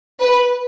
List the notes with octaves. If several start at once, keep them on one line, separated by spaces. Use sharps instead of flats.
B4